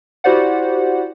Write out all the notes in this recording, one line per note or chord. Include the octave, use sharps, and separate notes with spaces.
E4 F#4 G4 C5 D5 F#5